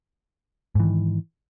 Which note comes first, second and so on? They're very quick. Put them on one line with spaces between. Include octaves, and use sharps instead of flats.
G#2 E3 D#3